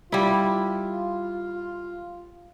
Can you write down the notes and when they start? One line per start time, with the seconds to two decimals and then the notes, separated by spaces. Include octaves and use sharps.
0.12 G3 E4 F4